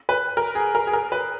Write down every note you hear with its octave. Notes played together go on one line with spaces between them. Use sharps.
B4
A#4
G#4
A#4
G#4
A#4
B4